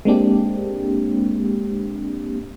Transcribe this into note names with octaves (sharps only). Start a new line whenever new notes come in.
G#3 A#3 C4 D4 G4